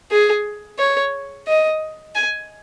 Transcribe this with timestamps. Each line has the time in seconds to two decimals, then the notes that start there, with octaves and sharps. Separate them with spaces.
0.11 G#4
0.79 C#5
1.47 D#5
2.15 G#5